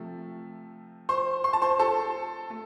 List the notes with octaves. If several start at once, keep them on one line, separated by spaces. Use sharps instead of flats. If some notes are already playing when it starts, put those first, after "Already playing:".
Already playing: C3 F3 A3
C5 C6
C6
A5
C5 C6
A4 A5
A3